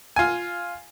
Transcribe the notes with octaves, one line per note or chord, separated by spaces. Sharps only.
F4 G#5